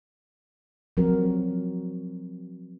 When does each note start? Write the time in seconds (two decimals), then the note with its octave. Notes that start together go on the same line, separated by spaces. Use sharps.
0.97 F3 F#3 C4 F#4 A#4